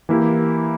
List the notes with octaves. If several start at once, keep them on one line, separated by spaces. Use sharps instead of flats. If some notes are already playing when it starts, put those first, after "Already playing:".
E3 A#3 E4 G4